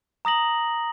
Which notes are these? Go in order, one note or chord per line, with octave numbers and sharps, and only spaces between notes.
A#5 D#6 A#6 F#7